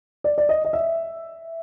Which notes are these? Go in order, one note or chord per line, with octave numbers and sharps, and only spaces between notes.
D5
D5
D#5
D#5
E5